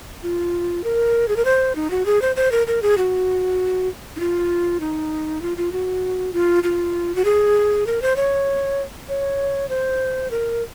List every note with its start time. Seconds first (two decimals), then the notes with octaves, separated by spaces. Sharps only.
0.23 F4
0.84 A#4
1.28 G#4
1.36 A#4
1.45 C5
1.75 D#4
1.91 F#4
2.06 G#4
2.22 C5
2.36 C5
2.52 A#4
2.67 A#4
2.82 G#4
2.98 F#4
4.16 D#4
4.20 F4
4.80 D#4
5.42 F4
5.57 F4
5.72 F#4
6.33 F4
6.63 F4
7.15 F#4
7.25 G#4
7.87 A#4
8.02 C5
8.16 C#5
9.09 C#5
9.69 C5
10.31 A#4